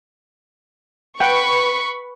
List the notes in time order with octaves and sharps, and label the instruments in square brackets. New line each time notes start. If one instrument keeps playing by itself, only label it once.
[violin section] B4 B5 C#6 [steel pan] F#5 G5